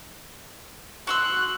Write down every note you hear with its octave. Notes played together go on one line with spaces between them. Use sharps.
F#4 C6 E6 F#6